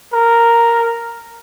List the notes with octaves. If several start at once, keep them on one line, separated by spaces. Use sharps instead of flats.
A#4